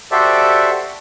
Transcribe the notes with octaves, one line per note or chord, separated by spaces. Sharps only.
F#4 G4 A4 C5 D5 E5